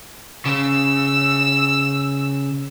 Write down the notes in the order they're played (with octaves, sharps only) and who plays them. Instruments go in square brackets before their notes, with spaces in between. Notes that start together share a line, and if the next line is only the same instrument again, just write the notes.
[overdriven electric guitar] C#3 [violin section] E6